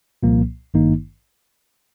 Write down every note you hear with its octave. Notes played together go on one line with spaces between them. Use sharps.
C2 A#2 F3 A#3
G#1 G2 D#3 A#3 D#4